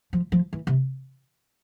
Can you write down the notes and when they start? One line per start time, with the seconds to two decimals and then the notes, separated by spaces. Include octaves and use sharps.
0.13 F3
0.32 F3
0.53 E3
0.67 C3